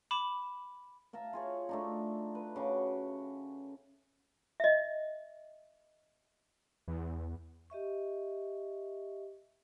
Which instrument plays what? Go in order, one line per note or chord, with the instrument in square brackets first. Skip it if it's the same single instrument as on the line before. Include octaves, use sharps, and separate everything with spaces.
[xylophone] B5 D6 E7
[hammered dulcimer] E5 F5 A5 A#5
F4 G#4 C#5
A3 D4 D#4
B4
C#3 F#4 D6
[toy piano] D#5 E5
[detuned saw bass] E2
[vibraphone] G4 D#5 E5 C#6